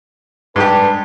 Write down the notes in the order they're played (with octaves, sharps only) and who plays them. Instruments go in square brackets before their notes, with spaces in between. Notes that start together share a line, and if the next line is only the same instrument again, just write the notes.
[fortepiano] G#2 G3 G4 [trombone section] D4 B4